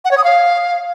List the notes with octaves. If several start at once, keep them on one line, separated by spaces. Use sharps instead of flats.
F#5
C#5
D#6
F5